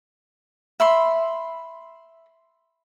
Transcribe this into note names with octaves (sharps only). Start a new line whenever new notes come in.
E5 B5 C6